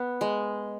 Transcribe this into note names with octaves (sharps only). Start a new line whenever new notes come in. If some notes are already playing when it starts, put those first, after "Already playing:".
Already playing: B3
G#3